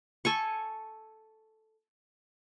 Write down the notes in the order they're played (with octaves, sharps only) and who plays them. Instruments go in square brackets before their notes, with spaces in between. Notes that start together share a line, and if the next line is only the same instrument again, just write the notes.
[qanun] A4 G#5 C#6